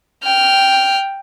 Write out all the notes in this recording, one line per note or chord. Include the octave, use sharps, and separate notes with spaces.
G5 F6